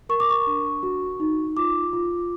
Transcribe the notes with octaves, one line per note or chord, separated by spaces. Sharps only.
A#4 C#6
D6
C#6
D4
F#4
D#4
F4 D6
F4